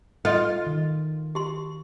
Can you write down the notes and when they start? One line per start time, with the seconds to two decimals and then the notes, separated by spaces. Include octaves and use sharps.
0.25 F4 A4 D#5
0.66 D#3
1.35 G4 C6